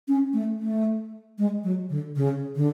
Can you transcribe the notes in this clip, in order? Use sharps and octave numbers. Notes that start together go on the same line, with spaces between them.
C#4
A3
A3
G#3
F#3
D3
C#3
D3